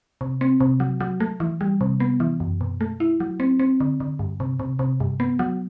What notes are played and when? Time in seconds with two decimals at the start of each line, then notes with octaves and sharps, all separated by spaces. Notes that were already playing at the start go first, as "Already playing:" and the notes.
0.21 C3
0.41 C4
0.61 C3
0.80 F#3
1.01 F#3
1.20 A3
1.40 E3
1.61 G3
1.81 C3
2.00 B3
2.20 E3
2.40 F#2
2.61 B2
2.81 A3
3.00 E4
3.20 F#3
3.40 C4
3.59 C4
3.80 D3
4.00 D3
4.19 G2
4.40 C3
4.60 C3
4.79 C3
5.00 G2
5.20 B3
5.39 F#3